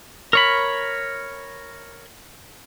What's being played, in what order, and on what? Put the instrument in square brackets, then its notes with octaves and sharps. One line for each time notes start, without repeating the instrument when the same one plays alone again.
[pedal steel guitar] A#4 C#5 B5